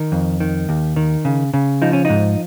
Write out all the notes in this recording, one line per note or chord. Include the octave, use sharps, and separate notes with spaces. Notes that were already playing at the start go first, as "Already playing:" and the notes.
Already playing: D#3
F2
D#3
D#2
D#3
C#3
C#3
F3 D#4
C#4
G#2 D#4